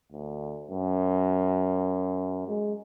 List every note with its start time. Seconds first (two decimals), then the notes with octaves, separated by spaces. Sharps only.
0.12 D2
0.71 F#2
2.47 G#3